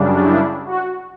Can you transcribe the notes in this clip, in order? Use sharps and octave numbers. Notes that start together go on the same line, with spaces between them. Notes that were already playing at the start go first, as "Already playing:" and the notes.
Already playing: F#2 C#3 G3 D4
E4
F#4